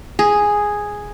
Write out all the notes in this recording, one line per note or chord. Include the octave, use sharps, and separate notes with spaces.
G#4